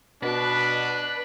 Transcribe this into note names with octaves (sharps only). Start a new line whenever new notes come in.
B2 D4 B4